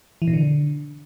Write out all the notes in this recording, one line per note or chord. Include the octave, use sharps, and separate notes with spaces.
E3
B2
D3